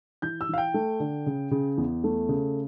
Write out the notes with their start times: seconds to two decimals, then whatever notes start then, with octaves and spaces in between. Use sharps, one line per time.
0.22 E3 G6
0.41 E6
0.49 E3 F5
0.58 G5
0.74 A3
1.00 D3
1.26 C#3
1.51 C#3
1.78 E2
2.04 A3
2.29 C#3